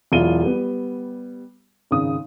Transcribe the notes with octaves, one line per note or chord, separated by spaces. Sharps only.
E1 F#3 E4 F4 D#7 G7
G3 B3
G#1 C#3 D#6